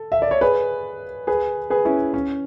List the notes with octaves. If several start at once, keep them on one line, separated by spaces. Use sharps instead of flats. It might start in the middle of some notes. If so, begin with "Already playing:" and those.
Already playing: A4
E5
D5
C#5
G#4 B4
G#4 B4
G#4 B4
C#4 E4
C#4